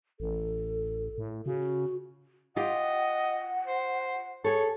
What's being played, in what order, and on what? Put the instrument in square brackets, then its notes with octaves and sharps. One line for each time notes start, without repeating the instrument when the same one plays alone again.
[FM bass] A1 [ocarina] A4
[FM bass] A2
[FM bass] C#3 [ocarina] F#4
[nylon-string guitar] F4 G4 [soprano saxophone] D#5 [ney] F#5
[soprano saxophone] C5
[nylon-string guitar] G#4 A4 [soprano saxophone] C#5